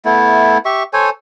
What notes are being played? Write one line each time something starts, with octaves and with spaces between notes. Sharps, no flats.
A3 B3 E4
G4 E5 C#6
A4 C5 C#5 G#5